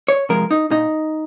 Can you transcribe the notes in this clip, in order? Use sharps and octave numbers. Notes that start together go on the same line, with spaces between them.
C#5
C3 F3 G#3 A#4
D#4
A#2 D#4